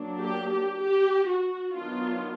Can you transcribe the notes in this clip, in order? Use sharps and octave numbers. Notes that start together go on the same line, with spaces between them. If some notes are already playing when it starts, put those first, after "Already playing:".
Already playing: F#3 A#3 D4
G4
G4
G4
F#4
D#3 F#3 B3 D4 F4